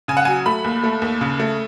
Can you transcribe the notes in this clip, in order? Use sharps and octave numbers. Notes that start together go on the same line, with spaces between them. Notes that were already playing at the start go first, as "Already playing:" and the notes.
C#3 G#5
F#5
F#3 G#5
A3 B5
D#2
A3
D#2
C#3
A3